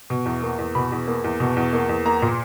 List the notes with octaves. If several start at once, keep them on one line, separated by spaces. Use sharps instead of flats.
B2
E2
A#3
E2
B2 B5
E2
A#3
E2
B2
E2
A#3
E2
A#3 A#5
A#2